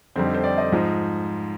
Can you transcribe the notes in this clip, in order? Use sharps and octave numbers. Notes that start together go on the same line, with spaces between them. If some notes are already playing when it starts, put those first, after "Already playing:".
F2 D3 G3 C4
D#4
C5
D5
D#5
G#2 F3